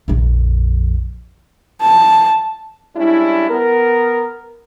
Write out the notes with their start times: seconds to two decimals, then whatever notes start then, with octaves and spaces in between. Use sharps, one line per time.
0.08 A#1 F2
1.81 A5
2.96 G3 G#3 C#4 D4 E4
3.50 B3 A#4